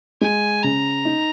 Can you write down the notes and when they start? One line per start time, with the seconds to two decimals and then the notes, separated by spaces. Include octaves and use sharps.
0.21 G#3 G#5
0.63 C#3 A#5
1.05 D#4